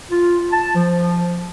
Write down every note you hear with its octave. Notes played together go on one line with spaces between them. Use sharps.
F4
A5
F3